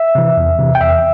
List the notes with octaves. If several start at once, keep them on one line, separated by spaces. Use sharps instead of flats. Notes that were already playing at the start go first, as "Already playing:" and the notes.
Already playing: E5
C3 E3
E2
C3 E3
G5
E2 E5